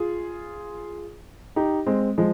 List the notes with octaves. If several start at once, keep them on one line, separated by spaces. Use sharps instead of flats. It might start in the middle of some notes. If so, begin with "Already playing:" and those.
Already playing: F4 G#4
D#4 G4
G#3 C4
F3 G#3